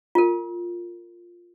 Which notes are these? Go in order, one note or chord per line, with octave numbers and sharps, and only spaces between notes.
F4 A#4